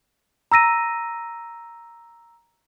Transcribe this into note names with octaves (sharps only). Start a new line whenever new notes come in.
A#5 E6 A#6 D#7